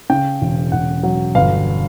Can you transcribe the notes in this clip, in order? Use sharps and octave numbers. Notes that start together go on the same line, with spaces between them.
C#3 G5
E1
E1 F#5
F#3
G1 F5